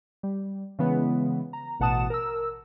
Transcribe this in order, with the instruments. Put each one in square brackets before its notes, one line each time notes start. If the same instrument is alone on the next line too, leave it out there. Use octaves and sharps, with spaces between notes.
[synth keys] G3
C#3 E3 G#3 B3
A#5
A1 B2 F#5 A5 D#6 E7
A#4 E6